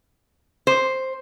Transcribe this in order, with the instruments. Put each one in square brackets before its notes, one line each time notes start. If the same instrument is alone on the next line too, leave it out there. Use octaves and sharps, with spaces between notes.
[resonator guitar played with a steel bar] C5